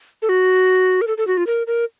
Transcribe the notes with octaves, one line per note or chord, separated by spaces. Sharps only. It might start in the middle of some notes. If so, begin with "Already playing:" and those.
A4
F#4
A#4
A4
A4
F#4
F4
A#4
A#4